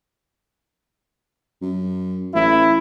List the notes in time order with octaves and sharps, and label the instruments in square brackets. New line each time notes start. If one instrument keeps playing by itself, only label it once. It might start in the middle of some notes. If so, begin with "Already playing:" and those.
[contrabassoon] F#2
[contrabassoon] A1 [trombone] E4